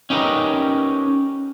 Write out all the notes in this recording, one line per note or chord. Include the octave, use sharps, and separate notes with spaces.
C#4 D#4 G4 A#4 B4